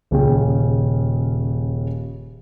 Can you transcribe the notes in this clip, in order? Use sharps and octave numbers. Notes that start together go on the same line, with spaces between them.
D#1 C#3 C#4 G#4 G5